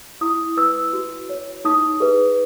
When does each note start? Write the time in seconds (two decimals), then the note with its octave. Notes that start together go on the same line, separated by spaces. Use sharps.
0.21 E4 D#6
0.57 B4 E6
0.93 F#4
1.29 C#5
1.65 D#4 D#6
2.00 G#4 B4